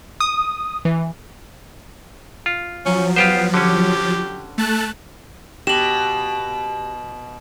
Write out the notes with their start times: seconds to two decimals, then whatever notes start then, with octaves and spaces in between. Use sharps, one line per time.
0.20 D#6
0.85 E3
2.46 F4
2.86 F3 F#3 C#4
3.16 B3 F4 G4 C5
3.54 D3 C#4 G4
4.58 A3 A5 F#6
5.67 B2 G4 E7 F#7